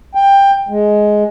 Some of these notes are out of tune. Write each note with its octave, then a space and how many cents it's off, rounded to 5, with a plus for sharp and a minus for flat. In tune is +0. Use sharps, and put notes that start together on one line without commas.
G5 +15
G#3 +10